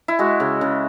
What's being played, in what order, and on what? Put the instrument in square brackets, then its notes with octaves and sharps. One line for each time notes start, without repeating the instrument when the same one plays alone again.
[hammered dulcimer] E4
G#3 F#4
C#3
C#3